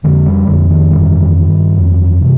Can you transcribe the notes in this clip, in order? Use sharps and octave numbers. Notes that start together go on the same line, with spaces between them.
F2 D3
G3
F2 D3
D#3
G2
G2
F2
C3